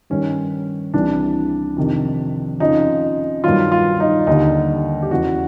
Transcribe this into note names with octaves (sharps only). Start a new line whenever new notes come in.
G2 D#3 G3 C#4
C2 C3 E3 G3 D4
F2 C3 D#3
F2 C#3 F3 D#4
G2 D#3 F#3 F4
F4
D#4
D#2 D3 G3 D#4
G4
E2 C#3 E3 F#4